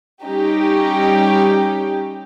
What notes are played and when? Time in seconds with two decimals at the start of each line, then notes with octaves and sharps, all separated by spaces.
0.23 G3 C#4 D#4 G4